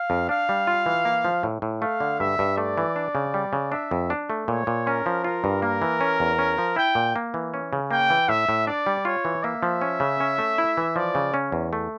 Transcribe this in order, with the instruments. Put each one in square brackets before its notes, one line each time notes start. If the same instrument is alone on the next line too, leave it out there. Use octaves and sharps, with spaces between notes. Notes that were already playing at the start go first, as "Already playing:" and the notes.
Already playing: [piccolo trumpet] F5
[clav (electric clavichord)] F2
[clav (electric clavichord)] D4 [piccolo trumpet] F5
[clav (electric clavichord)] G3
F4
E3
A#3
F3
A2
A2
[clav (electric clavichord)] A3 [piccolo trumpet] F5
[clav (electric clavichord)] D3
[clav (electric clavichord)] G2 [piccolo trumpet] E5
[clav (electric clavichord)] G2
[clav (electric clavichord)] A3 [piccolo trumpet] D5
[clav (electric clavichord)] E3
D4
C#3
G3
C#3
[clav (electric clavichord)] D4 [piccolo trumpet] E5
[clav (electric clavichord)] F2
D4
A3
[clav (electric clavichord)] A#2 [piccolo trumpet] C#5
[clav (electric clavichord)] A#2
[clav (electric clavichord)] C#4 [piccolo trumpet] A#4
[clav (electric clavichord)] F3
[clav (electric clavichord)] F4 [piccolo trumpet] A#4
[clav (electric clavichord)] G2
[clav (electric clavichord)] A#3 [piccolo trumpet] A#4
[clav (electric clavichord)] E3
C#4
E2
C#4
F3
[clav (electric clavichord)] E4 [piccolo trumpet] G5
[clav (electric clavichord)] A#2
A#3
E3
C#4
C#3
[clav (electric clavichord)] A#3 [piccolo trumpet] G5
[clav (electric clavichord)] E3
[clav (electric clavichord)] A2 [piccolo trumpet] E5
[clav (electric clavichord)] A2
[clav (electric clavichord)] D4 [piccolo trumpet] D5
[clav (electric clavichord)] G3
[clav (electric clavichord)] F4 [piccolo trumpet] C#5
[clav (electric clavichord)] E3
[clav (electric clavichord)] A#3 [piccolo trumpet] E5
[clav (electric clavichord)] F3
C#4
C#3
C#4
A3
E4
E3
[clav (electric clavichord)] F3 [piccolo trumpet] D5
[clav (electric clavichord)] C#3
C#4
E2
A3